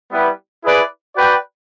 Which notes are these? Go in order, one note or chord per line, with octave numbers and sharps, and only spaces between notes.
G3 B3 E4 G4 B4
E4 G#4 B4 D5
F#4 B4 D5 G5